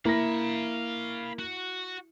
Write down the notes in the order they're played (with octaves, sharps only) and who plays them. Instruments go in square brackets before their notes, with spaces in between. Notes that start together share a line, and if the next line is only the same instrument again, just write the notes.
[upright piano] A#3 A#6 [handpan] E4 [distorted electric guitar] F5 B5
[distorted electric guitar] F#4